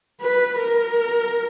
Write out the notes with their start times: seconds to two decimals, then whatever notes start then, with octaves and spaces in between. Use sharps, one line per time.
0.22 B4
0.59 A#4